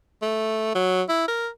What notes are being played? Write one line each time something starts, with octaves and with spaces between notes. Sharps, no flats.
A3
F#3
E4
A#4